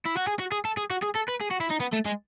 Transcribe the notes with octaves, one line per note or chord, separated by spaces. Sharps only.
E4
F#4
G#4
F#4
G#4
A4
G#4
F#4
G#4
A4
B4
G#4
F#4
E4
D#4
B3
A3
G#3